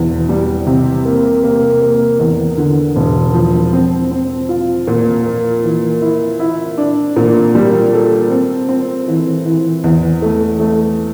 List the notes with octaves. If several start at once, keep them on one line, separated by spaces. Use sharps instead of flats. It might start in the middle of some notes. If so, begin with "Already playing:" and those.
Already playing: E1 E2 E3
G3
C3
A#3
A#3
A#3
E2
D3
E1
F3
C4
C4
F4
A#2
A#3
E3
E4
E4
D4
A#2
G3
A4
C4
C4
E3
E3
E2
A3
A3